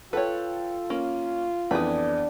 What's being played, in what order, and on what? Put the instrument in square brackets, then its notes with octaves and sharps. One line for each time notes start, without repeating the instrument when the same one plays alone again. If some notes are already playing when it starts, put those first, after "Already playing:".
[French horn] F4 [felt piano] A4 G5 [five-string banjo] B4 C#5
[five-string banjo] A#3 [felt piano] C#4
[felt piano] F2 E3 B3 [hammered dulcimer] D4 F#5 D6 [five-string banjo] G#4 B4